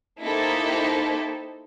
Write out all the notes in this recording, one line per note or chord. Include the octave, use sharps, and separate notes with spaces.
A#3 D#4 E4 G4 A4 C5